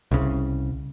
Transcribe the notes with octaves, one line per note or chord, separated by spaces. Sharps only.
C2 C#3